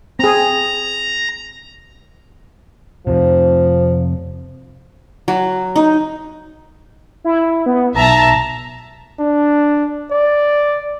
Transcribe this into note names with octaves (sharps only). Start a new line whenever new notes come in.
C4 G#4 A#5
F2 C3 F3
F#3
D#4
E4
B3
B1 E5 A5 A#5
D4
D5